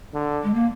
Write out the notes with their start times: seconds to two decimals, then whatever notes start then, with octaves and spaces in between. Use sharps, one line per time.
0.14 D3
0.43 G#3
0.54 A#3